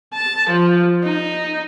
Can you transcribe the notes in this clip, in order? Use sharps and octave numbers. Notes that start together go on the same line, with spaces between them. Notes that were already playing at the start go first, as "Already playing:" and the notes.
A5
F3
D#4